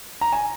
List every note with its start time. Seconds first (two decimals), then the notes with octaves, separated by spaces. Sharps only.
0.21 A#5
0.32 G#5